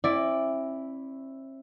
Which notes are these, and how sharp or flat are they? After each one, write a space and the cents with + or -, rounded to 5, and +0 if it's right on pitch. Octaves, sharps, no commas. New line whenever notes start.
C4 +45 E4 +0 D5 +0